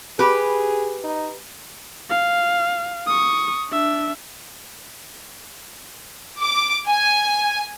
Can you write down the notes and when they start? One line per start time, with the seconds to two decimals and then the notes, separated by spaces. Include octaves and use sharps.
0.19 G4 G#4 B4
1.04 D#4
2.10 F5
3.07 C#6 D#6
3.70 D4 E5
6.39 D6
6.87 G#5